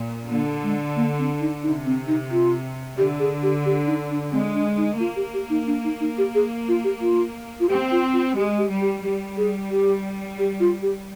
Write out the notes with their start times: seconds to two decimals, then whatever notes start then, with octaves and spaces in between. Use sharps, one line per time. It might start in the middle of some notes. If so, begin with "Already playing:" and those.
Already playing: A#2
0.29 D3 A#3
0.63 G#3
0.96 A#3
1.19 C4
1.40 D#4
1.63 C3 D#4
1.86 C4
2.08 D#4
2.31 F4
2.98 D3 G4
3.20 G#4
3.43 G4
3.66 G4
3.87 D#4
4.10 D4
4.32 G#3 C4
4.55 D4
4.77 D#4
4.99 A#3 F4
5.16 G4
5.34 G4
5.50 D#4
5.67 D4
5.84 D#4
6.00 D#4
6.18 G4
6.35 G#4
6.68 F4
6.84 G4
7.01 F4
7.60 F4
7.69 C4 G4
7.91 F4
8.13 F4
8.36 G#3 G4
8.58 G4
8.70 G3
8.81 G4
9.04 G3 G4
9.37 G#4
9.71 G4
10.39 G4
10.60 F4
10.82 G4